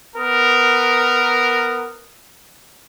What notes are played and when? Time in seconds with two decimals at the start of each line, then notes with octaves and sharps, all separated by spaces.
0.16 B3 A#4